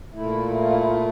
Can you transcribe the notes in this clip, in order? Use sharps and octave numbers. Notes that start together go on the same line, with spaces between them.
A#2 A3 E4
F4
E4
F4